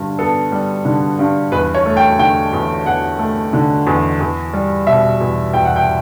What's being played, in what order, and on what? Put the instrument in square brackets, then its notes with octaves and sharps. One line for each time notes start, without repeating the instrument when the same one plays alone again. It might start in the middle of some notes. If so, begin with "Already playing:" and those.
Already playing: [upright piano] G2 D3 G3
B3 A4
G3
D3
G2
E2 B4
C#5
A3
G5
D3 G5
E2
E2 F#5
A3
D3
E2
E2
G3
B2 E5
E2
E2 G5
F#5
G5